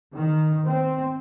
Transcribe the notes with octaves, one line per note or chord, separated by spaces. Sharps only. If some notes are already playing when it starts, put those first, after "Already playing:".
D#3
C4